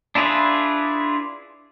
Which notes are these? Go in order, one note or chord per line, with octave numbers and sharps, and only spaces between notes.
D4 E4 F4 G#4 B4